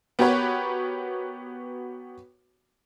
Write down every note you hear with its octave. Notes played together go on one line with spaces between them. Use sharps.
B3 F#4 G4 A#4 B4 C#5